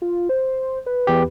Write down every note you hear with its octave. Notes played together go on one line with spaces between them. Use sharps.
F4
C5
B4
E2 G4